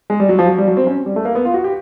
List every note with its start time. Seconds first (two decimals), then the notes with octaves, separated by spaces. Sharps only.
0.10 G#3
0.20 G3
0.29 F#3
0.39 F3
0.48 F#3
0.58 G3
0.68 F#3
0.77 C4
0.87 C#4
1.06 G3
1.16 A3
1.25 A#3
1.35 B3
1.45 F4
1.54 F#4
1.64 G4